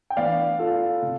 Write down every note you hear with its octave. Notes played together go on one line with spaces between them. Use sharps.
G5
E3 B3 D4 D5 F5
F4 A4
C3